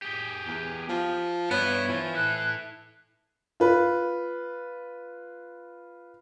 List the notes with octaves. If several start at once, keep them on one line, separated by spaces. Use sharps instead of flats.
G4 G#4
E2
F3
G2 B3 E4 C#5
E3 F3
E4 A4 F#6
F4 B4